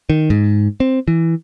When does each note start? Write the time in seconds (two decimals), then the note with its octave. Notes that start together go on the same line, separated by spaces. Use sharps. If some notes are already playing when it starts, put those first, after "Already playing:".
0.10 D#3
0.30 G#2
0.80 C4
1.08 E3